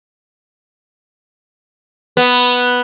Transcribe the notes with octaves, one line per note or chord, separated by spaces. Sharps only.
B3